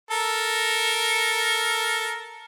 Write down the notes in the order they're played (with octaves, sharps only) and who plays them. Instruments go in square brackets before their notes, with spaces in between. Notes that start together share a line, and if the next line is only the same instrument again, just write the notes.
[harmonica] A4 A#4